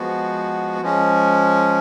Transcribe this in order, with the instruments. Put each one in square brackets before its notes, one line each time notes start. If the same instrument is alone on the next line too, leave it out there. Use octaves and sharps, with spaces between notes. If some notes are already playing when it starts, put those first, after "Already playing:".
Already playing: [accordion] F3 G#3 B3 F#4
F3 G#3 C#4